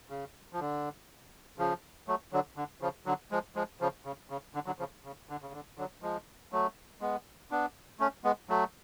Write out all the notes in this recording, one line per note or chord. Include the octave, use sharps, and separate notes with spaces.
C#3
F3
D3
C#3 F3
F#3 A3
D3 F#3
D3
C#3 F3
D3 F#3
F3 G#3
F3 G#3
C#3 F3
C#3
C#3
D3
D3 F#3
C#3 F3
C#3
D3
C#3
D3
D3 F#3
F3 G#3
F#3 A3
G#3 B3
B3 D4
A3 C#4
G#3 B3
F#3 A3